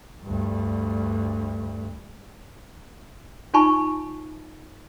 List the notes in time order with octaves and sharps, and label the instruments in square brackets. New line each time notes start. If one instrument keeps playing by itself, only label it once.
[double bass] D2 G2
[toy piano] D#4 F4 G#5 A5 B5 C#6